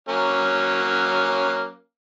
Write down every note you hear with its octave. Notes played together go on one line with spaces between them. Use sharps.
F#3 A#3 C#4